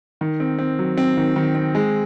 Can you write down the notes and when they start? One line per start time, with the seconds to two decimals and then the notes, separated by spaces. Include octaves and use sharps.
0.21 D#3
0.40 C4
0.59 C4
0.79 F#3
0.98 C4
1.17 D#3
1.36 D#3
1.55 C4
1.75 G#3